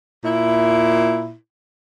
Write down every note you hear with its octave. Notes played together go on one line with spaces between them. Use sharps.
A#2 E4